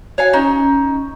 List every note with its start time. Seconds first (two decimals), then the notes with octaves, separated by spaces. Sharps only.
0.18 F#4 C#5 F5 G#5
0.33 C#4 D#4